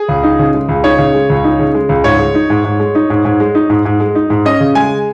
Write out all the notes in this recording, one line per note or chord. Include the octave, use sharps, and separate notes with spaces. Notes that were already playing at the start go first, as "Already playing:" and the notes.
Already playing: G#4
C#2
D#4
C#3
G#3
C#2
D#4 C#5
C#3
G#3
C#2
D#4
C#3
G#3
C#2
G#2 C#5
G#3
D#4
G#2
G#2
G#3
D#4
G#2
G#2
G#3
D#4
G#2
G#2
G#3
D#4
G#2
C#4 D#5
C#3
G#3 G#5